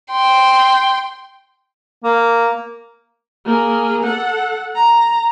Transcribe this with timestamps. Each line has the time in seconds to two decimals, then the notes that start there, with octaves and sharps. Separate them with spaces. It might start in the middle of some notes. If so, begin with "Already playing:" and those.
0.11 G5 C6
2.04 A#3
3.46 A#3 G#4
4.03 A4 F#5
4.76 A#5